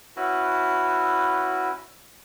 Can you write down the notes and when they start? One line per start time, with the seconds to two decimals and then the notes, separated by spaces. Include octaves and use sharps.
0.16 C#4 E4 F#4 B4